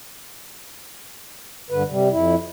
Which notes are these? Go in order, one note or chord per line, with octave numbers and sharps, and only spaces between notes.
G2 D3 B4
C3 G3
F2 E4